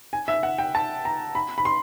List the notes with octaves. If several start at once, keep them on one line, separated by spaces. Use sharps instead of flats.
G#5
E5
F#5
G5
A5
A#5
B5
B5
C6